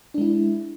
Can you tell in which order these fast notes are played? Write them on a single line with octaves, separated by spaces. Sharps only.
D4 G#3 E4